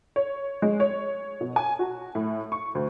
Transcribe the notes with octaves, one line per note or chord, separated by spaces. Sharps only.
C#5
G#3
C#5
B2
G#5
F#4
A2
C#6
D2